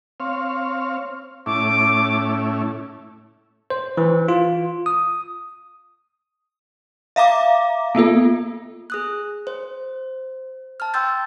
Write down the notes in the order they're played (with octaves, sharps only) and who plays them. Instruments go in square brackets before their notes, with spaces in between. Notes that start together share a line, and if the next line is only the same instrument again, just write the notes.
[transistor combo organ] C4 C#5 F5
[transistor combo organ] A2 C#4 E4 [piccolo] D6
[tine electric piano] C5
E3
F4
D#6
[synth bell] E5 F5 A#5 D6
A#3 B3 F4 A4
[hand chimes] G#4 D#6 F#6
C5
A5 F6
G5 C6 E6 G6 A6